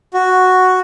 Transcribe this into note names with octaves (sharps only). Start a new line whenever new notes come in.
F#4